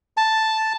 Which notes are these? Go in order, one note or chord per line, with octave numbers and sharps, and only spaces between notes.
A5